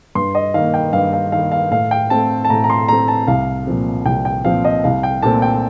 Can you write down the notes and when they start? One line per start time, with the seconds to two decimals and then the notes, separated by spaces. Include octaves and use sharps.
0.15 G2 C6
0.35 D#5
0.54 D#3 A#3 F5
0.74 G5
0.93 G2 F5
1.13 F5
1.32 D#3 A#3 F5
1.52 F5
1.71 A2 F5
1.91 G5
2.10 A3 C4 A5
2.45 A5
2.50 A2 A#5
2.64 A#5
2.70 C6
2.88 A3 C4 A#5
3.08 A5
3.28 C2 F5
3.67 A#2 F3 C4
4.06 C2 G5
4.25 G5
4.45 A#2 F3 C4 F5
4.65 D#5
4.84 C2 F5
5.03 G5
5.22 A#2 A3 C4 A5
5.42 G5